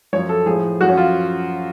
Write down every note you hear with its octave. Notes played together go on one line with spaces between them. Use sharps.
F#2 F3 C#5
A4
A2 F3 G#4
F#2 F3 F#4
C#4
F4